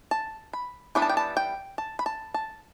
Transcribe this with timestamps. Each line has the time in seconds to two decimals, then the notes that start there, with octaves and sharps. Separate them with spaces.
0.11 A5
0.53 B5
0.95 E3 G3 B3 D4 B5
1.02 A5
1.09 G5
1.17 A5
1.37 G5
1.78 A5
1.99 B5
2.06 A5
2.34 A5